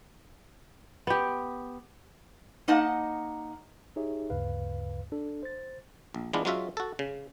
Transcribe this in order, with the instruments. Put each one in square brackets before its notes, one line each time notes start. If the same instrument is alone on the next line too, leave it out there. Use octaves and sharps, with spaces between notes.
[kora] B3 G4
[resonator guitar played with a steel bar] A#3 D#4 D#5 F#5 A5
[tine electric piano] D#4 G4 G#4 C#5 E5
D2 G2 C#3 B4 F5
D4 A4
C5 A6
[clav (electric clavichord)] A#1
E3 G#3 B3 D4 F4
F#3 G#3 C#4 F4 F#4 E5
F#4 A4
C#3